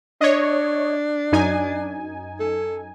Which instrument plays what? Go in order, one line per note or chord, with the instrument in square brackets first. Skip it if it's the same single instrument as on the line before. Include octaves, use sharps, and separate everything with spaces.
[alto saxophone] D4 [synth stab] C#5 D#5
[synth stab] F#2 D#4 G#5
[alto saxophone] A4